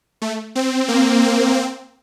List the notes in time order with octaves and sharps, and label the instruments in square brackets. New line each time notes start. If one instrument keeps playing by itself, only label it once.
[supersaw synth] A3
C4
A#3
C4
C4